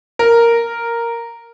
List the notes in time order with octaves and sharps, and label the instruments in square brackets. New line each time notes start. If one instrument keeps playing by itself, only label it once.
[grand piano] A#4